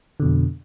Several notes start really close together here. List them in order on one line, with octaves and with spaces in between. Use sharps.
D3 B2 F2